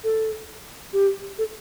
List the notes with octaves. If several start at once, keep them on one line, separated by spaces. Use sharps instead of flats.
A4
G4
A4